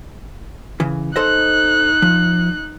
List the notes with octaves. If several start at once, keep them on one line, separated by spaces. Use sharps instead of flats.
C#3 E3
D#4 A4 C5 D#5 F#6
F3